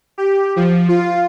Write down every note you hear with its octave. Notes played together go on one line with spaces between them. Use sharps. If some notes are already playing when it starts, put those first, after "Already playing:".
G4
F3
F4